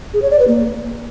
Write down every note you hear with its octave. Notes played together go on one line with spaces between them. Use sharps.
G#4
C#5
D5
B4
A#3